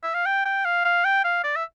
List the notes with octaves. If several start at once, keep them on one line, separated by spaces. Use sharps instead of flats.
E5
F5
G5
G5
F5
F5
G5
F5
D5
E5